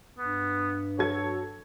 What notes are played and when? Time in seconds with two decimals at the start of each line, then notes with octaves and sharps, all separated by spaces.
0.18 G2 B3
0.98 F#3 A4 C#5 G#6